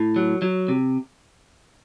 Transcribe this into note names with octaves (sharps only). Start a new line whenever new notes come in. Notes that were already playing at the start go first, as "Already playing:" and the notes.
Already playing: A2
F#3
F#3
C3